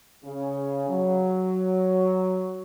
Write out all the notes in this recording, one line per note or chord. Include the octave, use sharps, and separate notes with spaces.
C#3
F#3